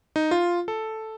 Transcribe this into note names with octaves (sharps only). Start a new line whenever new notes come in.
D#4
F4
A4